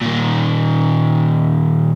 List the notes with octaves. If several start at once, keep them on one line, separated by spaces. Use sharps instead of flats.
A#2 D#3